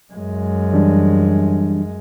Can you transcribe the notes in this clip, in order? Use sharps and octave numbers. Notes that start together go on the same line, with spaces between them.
F#2 G#3
E3 G3 D4